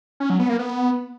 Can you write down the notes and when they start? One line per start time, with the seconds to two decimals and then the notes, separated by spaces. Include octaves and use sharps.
0.20 C#4
0.30 F#3
0.40 B3
0.49 A#3
0.59 B3